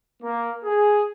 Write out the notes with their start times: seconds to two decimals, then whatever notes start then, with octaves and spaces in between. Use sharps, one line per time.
0.22 A#3
0.64 G#4